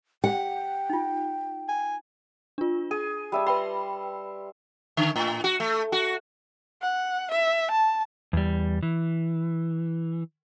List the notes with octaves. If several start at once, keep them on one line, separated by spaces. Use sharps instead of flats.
G4 F#5 G5
D#4 F4
G#5
D4 F4
G#4 D#7
G3 E5 A5
B4 G5 B5 C6
D3
A2
F#4
A3
F#4
F#5
E5
A5
E2 G3
E3